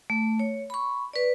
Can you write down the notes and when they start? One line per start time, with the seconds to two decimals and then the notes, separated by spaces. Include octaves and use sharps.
0.10 A3
0.39 C#5
0.70 B5 C#6
1.13 B4 D5